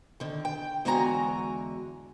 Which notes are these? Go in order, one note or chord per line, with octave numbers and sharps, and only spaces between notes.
D3 D#3
G5
E2 D3 G#3 F#4 G#5 A#5